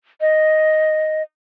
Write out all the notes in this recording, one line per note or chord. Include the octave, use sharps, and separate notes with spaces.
D#5